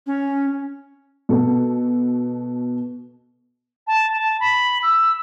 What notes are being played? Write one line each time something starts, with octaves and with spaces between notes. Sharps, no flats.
C#4
B2 A4
A5
A5
B5
E6